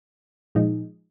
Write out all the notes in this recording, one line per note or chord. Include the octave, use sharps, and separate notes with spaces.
A#2 F3 G#3 D#4